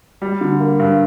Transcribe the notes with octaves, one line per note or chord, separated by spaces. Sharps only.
G3
D3
A#3
G2